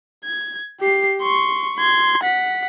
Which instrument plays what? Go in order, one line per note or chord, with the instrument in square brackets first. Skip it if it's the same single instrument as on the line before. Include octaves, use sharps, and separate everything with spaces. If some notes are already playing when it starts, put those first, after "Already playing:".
[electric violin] G#6
G4 C7
C6 C#6
C6 G#6
F#5 B6